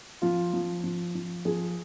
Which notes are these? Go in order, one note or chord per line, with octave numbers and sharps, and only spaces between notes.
F3 F4
F3
F3
F3
F3 G#4